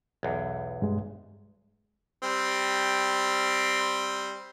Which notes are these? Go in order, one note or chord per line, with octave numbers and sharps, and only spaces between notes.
B1 E2
G2 G#3
G3 C4